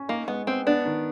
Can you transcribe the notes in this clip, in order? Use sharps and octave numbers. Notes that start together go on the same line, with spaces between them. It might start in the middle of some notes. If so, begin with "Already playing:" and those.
Already playing: C#4
A#3 D#4
G#3 B3
B3 C4
B3 D4
D#3